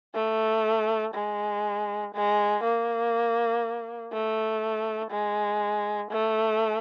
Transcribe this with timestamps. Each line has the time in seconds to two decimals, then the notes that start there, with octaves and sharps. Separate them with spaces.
0.15 A3
1.14 G#3
2.15 G#3
2.64 A#3
4.13 A3
5.11 G#3
6.11 A3